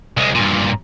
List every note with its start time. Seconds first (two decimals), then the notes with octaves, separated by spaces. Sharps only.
0.17 C2 G#3
0.35 G2 A#2